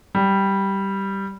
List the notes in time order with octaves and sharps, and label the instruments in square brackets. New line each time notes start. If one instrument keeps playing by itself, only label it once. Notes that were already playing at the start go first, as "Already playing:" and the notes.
[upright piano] G3